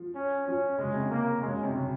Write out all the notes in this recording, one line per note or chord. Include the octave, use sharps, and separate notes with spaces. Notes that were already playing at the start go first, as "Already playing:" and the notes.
Already playing: F3
C#4
F3 C#4
C#3 G#3
C3
A#3
C#3 G#3
C#3
C3
C#3